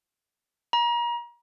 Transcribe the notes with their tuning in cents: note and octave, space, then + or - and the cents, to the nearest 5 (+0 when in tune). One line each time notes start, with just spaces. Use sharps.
A#5 +35